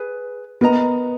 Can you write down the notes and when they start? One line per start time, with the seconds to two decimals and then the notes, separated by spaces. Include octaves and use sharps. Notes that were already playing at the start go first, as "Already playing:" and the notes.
Already playing: G#4 B4
0.61 B3 A#4 D#5 A#5